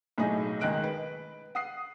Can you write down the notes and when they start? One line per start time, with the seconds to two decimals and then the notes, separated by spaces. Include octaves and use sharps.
0.18 B1 A2 A3 D#4 G#4 D#5
0.61 C#2 D#3 G#3 F#6 D7
0.84 B4
1.55 F#5 D#6 C7